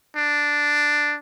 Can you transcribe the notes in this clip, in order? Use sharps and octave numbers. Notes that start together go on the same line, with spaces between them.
D4